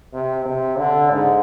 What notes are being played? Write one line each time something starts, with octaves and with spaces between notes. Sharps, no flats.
C3
C3
D3
G#2